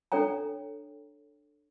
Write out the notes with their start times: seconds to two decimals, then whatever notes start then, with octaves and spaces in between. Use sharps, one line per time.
0.12 D4 A4 C#5 G5 A#5